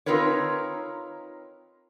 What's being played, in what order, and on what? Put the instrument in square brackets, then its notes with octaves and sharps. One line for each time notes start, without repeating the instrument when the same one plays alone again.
[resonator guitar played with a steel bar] C4 D#4 F4 A#4 B4 C#5